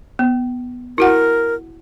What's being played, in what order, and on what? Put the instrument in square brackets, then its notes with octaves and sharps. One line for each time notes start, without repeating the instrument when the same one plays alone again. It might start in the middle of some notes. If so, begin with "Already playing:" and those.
[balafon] B3
[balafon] E4 F#4 F#5 [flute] A#4